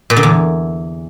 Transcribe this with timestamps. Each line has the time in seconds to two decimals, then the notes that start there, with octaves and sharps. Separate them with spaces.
0.10 A#2
0.16 D3
0.23 E2